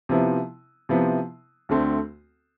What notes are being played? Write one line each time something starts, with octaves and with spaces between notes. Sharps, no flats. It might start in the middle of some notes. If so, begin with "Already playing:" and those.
C3 F3 B3 E4
C3 F3 B3 E4
D2 D3 A3 C4